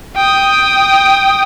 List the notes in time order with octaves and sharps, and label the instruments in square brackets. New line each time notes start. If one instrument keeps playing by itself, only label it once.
[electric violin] G5 D#6